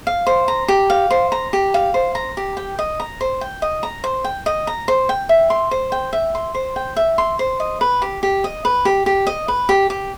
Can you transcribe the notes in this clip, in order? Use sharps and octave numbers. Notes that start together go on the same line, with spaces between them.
F5
C5
A#5
G4
F5
C5
A#5
G4
F5
C5
A#5
G4
G5
D#5
A#5
C5
G5
D#5
A#5
C5
G5
D#5
A#5
C5
G5
E5
C6
C5
G5
E5
C6
C5
G5
E5
C6
C5
D#5
B4
G4
G4
D#5
B4
G4
G4
D#5
B4
G4
G4